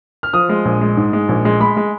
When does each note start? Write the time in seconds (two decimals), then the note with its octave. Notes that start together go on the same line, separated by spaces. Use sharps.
0.23 F6
0.33 F3 D#6
0.49 G#3
0.65 A#1
0.81 G#3
0.97 G#2
1.13 G#3
1.29 A#1
1.45 G#3
1.60 G#3 B5
1.77 G#3